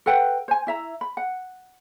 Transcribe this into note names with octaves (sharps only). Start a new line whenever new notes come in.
A4 B4 F#5 G5
C5 G#5
E4 E5 A#5
B5
F#5